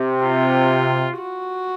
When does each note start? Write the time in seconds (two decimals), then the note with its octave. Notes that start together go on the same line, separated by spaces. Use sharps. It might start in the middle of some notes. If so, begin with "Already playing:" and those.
Already playing: C3
0.21 F4
1.18 F#4